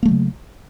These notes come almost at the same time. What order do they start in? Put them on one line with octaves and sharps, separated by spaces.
A#3 A3 F#3 C#3